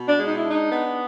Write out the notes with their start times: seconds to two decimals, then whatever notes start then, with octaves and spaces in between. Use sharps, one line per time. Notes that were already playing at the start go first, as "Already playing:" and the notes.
Already playing: B2
0.08 D4
0.17 G#3
0.26 D#4
0.37 E4
0.44 D4 D#4
0.70 B3